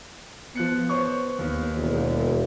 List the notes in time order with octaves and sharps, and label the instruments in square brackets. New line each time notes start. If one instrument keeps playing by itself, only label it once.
[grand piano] F3 F#6 C#7 [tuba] B3
[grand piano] C5 C#5 C#6
D#2 D#3
[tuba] E1